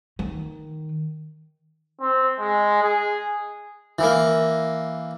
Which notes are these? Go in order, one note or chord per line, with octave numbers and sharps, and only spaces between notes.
D#3
C4
G#3
G#4
E3 A#3